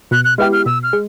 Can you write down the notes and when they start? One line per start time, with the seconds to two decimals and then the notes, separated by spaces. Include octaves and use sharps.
0.11 B2 F#6
0.25 F#6
0.38 G#3 B3 E4 G4 F6
0.53 F6
0.66 B2 E6
0.83 F6
0.93 G#3